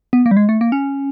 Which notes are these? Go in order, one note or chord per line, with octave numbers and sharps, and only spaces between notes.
B3
A#3
G3
G#3
A3
A#3
C#4